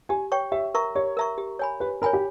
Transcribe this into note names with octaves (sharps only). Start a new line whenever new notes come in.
G4 G#5
C#5 G5 C#6
G4 E5
A#4 E5 A#5 C#6
G4 C#5
A#4 E5 A#5 C#6
G4
C#5 G#5 B5
G4 B4
A#4 C#5 G#5 B5
G4